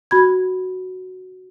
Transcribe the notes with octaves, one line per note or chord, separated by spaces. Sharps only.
F#4 B5 G#6